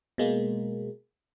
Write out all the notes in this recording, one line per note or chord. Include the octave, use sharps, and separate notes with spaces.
B2 G#3 A#3